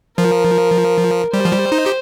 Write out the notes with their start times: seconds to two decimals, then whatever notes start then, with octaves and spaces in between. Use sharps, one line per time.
0.18 F3 A#4
1.33 G3 C5
1.45 F3
1.52 G3
1.72 D#4
1.86 G4